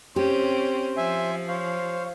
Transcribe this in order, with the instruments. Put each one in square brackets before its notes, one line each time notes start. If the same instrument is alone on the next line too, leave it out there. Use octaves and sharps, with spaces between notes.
[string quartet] C4 C#4 [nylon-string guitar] G4 [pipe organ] C5
[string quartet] F3 [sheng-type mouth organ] E5 G#5
[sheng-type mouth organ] C5 F5 [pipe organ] C#5